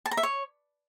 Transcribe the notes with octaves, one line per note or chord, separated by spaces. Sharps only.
A5
A#5
E5
C#5